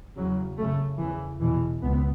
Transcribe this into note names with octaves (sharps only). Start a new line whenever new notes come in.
E2 C#3 F#3
F#2 C#3 A3
E2 C#3 E3
E2 B2 E3
C#2 B3